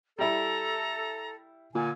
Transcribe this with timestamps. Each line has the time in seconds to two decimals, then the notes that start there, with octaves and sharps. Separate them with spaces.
0.19 G3 E4 A4 A#5
1.75 A#2 D3 G#5